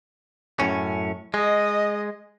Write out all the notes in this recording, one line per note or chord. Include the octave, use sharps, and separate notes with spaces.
F#2 A2 C#4
G#3 D#5